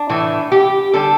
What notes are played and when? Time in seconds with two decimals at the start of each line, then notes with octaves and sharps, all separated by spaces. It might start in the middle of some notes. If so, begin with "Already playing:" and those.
Already playing: D4
0.09 A2 E3 A3
0.52 G4
0.94 D3 G3 A4